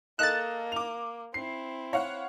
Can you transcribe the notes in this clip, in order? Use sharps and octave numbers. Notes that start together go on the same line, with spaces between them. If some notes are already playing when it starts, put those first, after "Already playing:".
A#3 A4 D#5 F#6 A6 E7
D6 F7
C4 E4 C7
C#5 F5 F#5